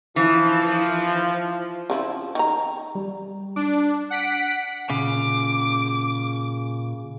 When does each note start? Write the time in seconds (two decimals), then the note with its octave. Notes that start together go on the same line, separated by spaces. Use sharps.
0.16 E3 F3
1.90 C#3 F3 E4
2.35 D#3 A#5
2.95 G3
3.56 D4 D6
4.10 F#5 B6 D7
4.90 A#2 C#3 D6